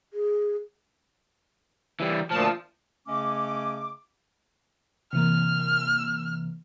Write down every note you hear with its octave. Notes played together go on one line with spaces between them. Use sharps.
G#4
E3 G3
D2 A#2 F3 A5
C#3 A3 C#4 D#5 D6
C3 E3 A#3 F6